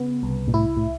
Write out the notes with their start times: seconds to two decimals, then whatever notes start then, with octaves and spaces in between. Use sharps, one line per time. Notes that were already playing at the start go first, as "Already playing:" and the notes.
Already playing: C#3 B3
0.23 C2
0.48 A#2
0.54 A2 E4
0.77 A2